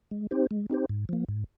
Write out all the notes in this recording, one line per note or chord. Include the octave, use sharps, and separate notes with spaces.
G#3
C4 D#4 G4 C5
G#3
C4 D#4 G4 C5
G#2
F3 A#3
G#2